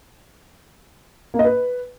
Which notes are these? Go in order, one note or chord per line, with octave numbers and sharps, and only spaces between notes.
A#3
D#5
B4